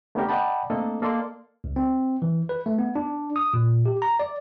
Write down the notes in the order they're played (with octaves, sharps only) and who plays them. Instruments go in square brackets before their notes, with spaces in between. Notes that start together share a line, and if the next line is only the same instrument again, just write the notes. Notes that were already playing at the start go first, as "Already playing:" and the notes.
[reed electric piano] A3 B3 C#4 D4 G4 A#4
D5 D#5 F#5 G5 A5 B5
A3 A#3 C4 D4 A4 D#5
A#3 A4 D5 D#5 C6
[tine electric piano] C#2
C4
E3
B4
A3
B3
D4
D#6
A#2
G4
A#5
D5